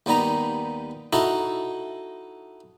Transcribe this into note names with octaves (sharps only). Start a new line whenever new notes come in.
D#2 G3 B3 D#4 A#5
D#4 E4 F#4 A4 D#5